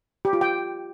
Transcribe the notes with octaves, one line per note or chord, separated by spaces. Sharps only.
G4
F4
G5